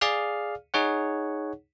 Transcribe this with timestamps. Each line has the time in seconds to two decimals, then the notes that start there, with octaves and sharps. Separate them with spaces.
0.01 G#4 D5 F5 F6
0.74 D#4 G#4 C#5 F#5